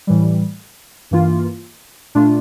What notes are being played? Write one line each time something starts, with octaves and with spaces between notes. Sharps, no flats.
A2 E3 G3
G2 E3 A#3 F4
A#2 A3 D4 F4